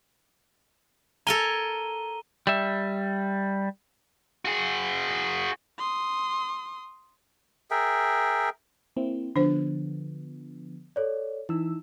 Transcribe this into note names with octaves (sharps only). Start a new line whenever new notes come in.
A4 A#4 G#5 A#5 D#7 G7
G3 E5
F#4 G#4
C6 D#6
G#4 A#4 E5 G5
A#3 C4 E4
D3 F3 B3 D4 C5
A4 C#5 D5
E3 D#4 E4 E6